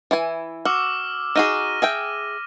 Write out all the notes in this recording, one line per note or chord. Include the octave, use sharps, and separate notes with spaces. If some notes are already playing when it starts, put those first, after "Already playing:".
E3 E4 G#5
F#4 D6 E6 F6
D#4 F#4 G#4 F6 A#6 D#7
G#4 E5 G5